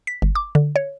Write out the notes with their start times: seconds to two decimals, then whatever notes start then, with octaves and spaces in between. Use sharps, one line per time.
0.07 B6
0.22 G1
0.35 D6
0.55 D3
0.76 C#5